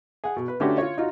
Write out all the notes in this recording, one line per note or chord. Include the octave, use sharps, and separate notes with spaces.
G#4 F#5
B2
B4
D3 A3 C#4 D4 F#4 G4
F4 C#5
D#4 F4 F#4